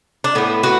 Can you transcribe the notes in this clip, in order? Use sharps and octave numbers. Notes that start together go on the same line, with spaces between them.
D4
A2 A3 B3
F#4 B4